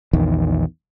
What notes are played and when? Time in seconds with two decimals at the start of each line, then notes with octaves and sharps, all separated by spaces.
0.13 A#1 E2 D#3